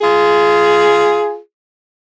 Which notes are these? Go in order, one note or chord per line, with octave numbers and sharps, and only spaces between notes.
F4 G#4